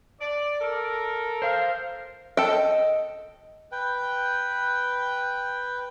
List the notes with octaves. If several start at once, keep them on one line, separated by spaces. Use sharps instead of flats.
D5
A4 A#4
C5 F5
A4 D#5 G5
B4 G5